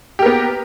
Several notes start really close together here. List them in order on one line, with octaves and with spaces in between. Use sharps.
G4 A#4 B3